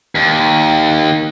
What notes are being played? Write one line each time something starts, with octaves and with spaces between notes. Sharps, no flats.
D#2